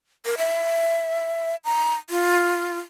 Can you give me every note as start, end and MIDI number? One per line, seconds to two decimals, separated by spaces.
0.25 0.35 70
0.38 1.56 76
1.65 1.94 82
2.10 2.78 65